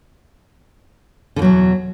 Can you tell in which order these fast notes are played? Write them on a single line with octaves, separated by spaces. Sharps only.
D3 E2 F#3 B2